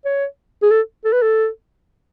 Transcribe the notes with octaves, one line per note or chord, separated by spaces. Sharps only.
C#5
G#4
A4
A4
B4
A4